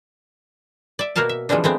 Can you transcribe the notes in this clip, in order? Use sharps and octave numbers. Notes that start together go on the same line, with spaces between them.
D5 E5
B2 A#3 F#4 A#4 F5 A5
E5
E3 F3 G3 G#3 C4 D4
G#3 A3 B3 C4